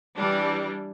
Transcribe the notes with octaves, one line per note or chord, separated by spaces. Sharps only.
E3 G3 D4